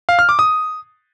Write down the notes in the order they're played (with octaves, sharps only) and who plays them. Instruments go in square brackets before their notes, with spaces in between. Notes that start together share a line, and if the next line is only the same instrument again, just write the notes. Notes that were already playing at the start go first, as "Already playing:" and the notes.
[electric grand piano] F5
F6
D6
D#6